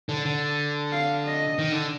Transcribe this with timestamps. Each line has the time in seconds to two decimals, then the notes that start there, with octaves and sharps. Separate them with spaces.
0.09 D3
0.26 D3
0.92 F5
1.25 D#5
1.59 D#3
1.72 D3